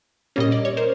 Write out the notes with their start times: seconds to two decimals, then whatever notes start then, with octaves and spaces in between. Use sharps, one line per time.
0.36 A#2 G3 A#3 C#4 D#5
0.52 D5
0.65 C#5
0.77 A#4 C5